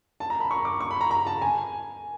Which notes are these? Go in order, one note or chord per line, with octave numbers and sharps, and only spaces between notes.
A5
A#5
B5
C#6
D6
C#6
B5
A#5
A#5
A5
G#5